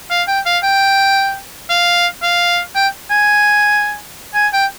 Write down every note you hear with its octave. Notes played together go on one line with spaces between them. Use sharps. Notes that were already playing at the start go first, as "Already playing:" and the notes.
F5
G5
F5
G5
F5
F5
G5
G#5
G#5
G5